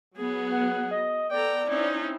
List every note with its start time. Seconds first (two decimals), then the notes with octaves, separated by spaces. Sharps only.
0.17 F#3 B3 G#4
0.51 F#5
0.91 D#5
1.31 B3 A4 D5 G5 A#5
1.69 C4 C#4 D#4 E4